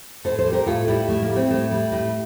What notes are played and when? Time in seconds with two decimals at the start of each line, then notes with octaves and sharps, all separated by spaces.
0.25 A2 A4 C5
0.39 A4 C5
0.46 G3
0.53 G4 A#4
0.66 A2 F4 A4
0.88 G3 E4 G4
1.08 A2 A3
1.22 A#3
1.29 G3
1.36 A3 C4
1.50 A2 A3
1.71 G3
1.92 A2